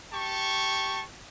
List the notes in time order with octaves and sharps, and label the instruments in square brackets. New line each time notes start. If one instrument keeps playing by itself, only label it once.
[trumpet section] G4 A5 C#6